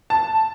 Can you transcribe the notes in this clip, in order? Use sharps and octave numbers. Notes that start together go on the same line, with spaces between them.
A5